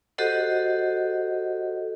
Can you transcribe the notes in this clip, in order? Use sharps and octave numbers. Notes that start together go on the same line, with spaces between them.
F#4 G4 A4 C5 D#5 F#5